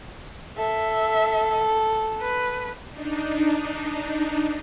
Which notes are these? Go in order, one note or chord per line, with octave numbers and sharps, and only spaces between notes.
A4 E5
B4
D4 D#4